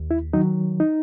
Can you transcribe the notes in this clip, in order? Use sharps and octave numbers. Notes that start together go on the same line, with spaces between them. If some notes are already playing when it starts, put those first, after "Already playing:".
Already playing: D#2
E4
D#3 F#3 D#4
D#4